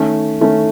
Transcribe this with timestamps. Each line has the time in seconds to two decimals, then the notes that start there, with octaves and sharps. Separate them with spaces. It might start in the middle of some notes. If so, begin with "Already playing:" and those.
Already playing: D#3 A3 C#4
0.41 D#3 A3 C#4